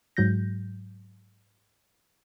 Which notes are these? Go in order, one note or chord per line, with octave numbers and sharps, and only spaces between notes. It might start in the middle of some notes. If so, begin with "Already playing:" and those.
G#2 F#3 G6 A#6